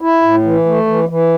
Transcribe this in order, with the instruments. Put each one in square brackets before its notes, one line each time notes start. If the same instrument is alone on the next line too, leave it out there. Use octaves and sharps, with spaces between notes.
[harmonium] E4
A2
E3
A3
E3
E3